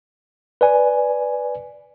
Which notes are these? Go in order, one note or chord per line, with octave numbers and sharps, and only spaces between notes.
B4 D5 G#5